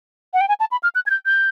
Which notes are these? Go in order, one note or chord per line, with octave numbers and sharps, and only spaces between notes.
F#5
G5
G#5
A5
B5
F6
F#6
G#6
G6
G6